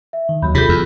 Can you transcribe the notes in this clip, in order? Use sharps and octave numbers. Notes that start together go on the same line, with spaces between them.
E5
D#3
D#2 F#3 B5 G6
C3 F4 G#4 A4 B5 G6
E2